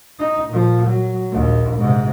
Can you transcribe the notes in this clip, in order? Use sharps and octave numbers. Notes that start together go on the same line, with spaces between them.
D#4
A#2 F3
F#3
A#1 D#2
G#2 C3